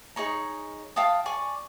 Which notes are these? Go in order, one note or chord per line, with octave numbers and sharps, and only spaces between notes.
D#4 G#4 C#5 A#5
F5 G5 A5 D#6
D5 G#5 C#6